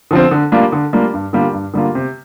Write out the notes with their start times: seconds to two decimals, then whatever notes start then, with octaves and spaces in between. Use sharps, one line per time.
0.11 D3 F3 C4
0.31 D3
0.52 G3 A#3 D4 F4
0.72 D3
0.93 G3 A#3 D4 F4
1.14 G2
1.33 D3 G3 A#3 F4
1.53 G2
1.74 D3 G3 A#3 F4
1.95 C3